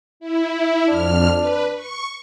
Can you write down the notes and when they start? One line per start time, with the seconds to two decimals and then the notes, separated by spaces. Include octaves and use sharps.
0.20 E4
0.88 F2 D4 F6
1.39 B4
1.75 C#6